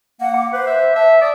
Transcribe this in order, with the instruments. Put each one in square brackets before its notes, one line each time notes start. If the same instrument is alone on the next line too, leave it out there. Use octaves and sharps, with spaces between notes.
[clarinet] A#3 [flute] F#5
[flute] D6
[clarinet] B4 [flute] C5
[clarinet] E5
[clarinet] E5 [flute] A5
[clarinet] D5 [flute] D#6